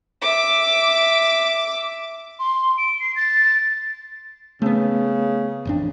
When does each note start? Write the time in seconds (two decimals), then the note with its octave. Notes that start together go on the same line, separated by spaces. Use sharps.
0.22 E5 D6
2.39 C6
2.78 D7
3.00 C7
3.16 A6
4.62 C#3 A3 B3
5.65 A1 F2 D4